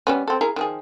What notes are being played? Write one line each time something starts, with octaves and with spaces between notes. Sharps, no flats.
G3 B3 C#4
C4 A4
E4 G#4 A#4
D#3 F3 G#4